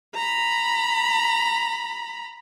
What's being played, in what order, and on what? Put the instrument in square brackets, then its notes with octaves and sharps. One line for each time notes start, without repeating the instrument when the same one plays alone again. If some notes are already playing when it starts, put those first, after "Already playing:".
[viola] A#5 B5